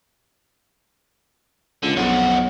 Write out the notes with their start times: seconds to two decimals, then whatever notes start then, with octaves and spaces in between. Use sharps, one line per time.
1.83 C#2 D3
1.96 B1 F2 F#4